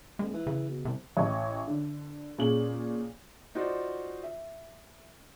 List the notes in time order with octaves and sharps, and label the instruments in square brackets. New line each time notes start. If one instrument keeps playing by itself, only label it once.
[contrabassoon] D#1 [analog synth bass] G#3
[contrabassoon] E3
[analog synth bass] C#3
[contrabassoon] B2
[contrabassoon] C2 [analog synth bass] C3
[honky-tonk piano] A1 C#5 D#5
D3
A#2 C#4 G#4 F#7
[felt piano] D#4 F4 F#4 C5 D5
E5